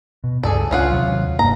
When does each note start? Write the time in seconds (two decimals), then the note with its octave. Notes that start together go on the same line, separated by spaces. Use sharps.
0.24 B2
0.43 C#2 G2 G#4 A4 D5
0.71 C#2 C#4 F4 F#5
0.92 D#2 C3 F#3
1.39 F1 G2 A#3 A#5